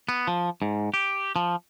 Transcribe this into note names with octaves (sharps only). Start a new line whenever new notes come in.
B3
F3
G#2
G4
F3